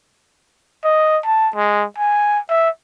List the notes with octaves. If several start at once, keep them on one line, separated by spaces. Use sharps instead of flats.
D#5
A5
G#3
G#5
E5